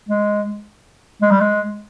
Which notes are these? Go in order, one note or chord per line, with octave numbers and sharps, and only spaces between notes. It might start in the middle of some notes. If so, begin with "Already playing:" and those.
G#3
G#3
G3
G#3